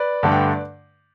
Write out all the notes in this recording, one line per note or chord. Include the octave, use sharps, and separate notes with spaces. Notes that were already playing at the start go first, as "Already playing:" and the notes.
Already playing: B4 D5
G2 D3 A3 D4
G5